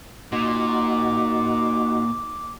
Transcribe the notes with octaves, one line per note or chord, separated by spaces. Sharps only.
A#2 D#4 F#4 D6